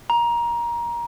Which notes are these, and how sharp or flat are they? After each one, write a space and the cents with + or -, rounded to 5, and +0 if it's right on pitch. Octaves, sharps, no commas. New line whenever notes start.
A#5 +20